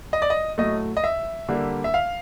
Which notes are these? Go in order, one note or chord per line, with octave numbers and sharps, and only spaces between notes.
D#5
D5
D#5
A2 F#3 A3 D#5
D#5
E5
D3 G3 A#3
E5
F5